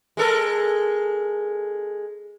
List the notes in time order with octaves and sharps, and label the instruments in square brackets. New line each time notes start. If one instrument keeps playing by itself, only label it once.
[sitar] G#3 A4 A#4